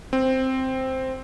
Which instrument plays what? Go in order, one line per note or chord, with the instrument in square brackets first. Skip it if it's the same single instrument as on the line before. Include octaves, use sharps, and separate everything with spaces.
[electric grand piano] C4